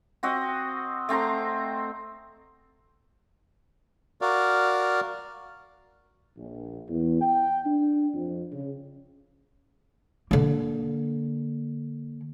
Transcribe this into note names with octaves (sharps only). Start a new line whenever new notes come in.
C4 F#4 D#5
A3 C4 A#5 C6
F#4 A#4 D5 F5
A#1
E2
G5
D4
F2
C#3
D3 A#3